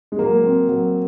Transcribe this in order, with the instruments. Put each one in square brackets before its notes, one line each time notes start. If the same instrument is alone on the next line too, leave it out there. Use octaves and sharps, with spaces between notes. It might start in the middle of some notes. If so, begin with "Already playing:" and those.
[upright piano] G#3
[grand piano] F#3 [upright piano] A#3
[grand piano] C4
F#3